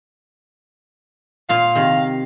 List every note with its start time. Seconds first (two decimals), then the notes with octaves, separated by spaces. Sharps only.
1.49 A#2 F4 F5
1.75 C3 D#3